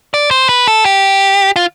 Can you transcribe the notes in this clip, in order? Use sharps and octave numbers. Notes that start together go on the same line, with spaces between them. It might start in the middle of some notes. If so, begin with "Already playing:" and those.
D5
C5
B4
A4
G4
F4